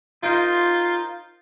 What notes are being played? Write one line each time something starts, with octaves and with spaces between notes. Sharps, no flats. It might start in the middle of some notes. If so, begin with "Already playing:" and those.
D#4 F4 A#4 C5